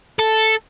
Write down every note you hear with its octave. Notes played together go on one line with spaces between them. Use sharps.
A4